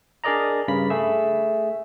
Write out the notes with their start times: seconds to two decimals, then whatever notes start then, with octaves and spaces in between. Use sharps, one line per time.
0.24 D4 G#4 A#4 D5 D#5 A#5
0.68 G2 C#3 B5 B6
0.90 A3 G#4 E5 E6